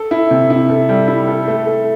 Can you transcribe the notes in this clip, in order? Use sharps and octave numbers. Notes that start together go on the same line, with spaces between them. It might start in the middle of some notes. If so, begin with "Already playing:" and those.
Already playing: A4
E4
C3
E4
A4
G3
E4
A4
A3
A3